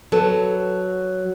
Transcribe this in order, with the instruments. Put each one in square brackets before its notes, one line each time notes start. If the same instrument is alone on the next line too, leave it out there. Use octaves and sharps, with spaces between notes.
[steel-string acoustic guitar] F#3 [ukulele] A4 B4 C#5